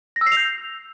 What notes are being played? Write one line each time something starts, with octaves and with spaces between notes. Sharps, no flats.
A#6
E6
C7
F7
G6